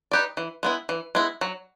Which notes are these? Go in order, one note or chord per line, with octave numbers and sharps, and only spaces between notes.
D#4 G4 B4 D5
E3
G#3 B3 E4
E3
G#3 B3 E4
F#3